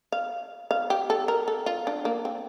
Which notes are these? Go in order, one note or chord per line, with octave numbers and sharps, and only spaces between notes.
F5
F5
G4
A4
A#4
A4
F4
D4
A#3
C4